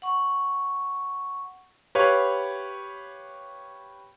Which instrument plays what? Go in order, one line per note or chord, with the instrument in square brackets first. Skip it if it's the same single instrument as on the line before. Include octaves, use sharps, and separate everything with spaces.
[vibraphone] F#5 C#6
[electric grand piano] G4 B4 C#5 F5 B5